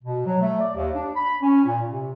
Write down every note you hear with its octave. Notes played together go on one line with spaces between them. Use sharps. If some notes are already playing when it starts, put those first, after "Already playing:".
B2
F#3
A3
D5
D#2
D4
B5
C#4
A#2
C3